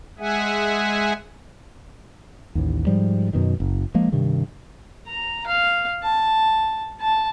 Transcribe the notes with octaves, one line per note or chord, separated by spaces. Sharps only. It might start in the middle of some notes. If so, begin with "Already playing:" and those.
G#3 G#4 E5 F#5 G#5
A1 D#2
G#2 F3 G3
F#2 B2 D#3
F#1
F3 G#3 A#3
G2 C3 D#3
A#5
F5
A5
A5